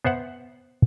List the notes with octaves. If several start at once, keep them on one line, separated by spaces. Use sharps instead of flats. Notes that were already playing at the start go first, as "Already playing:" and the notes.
B3 C5 E5 F#5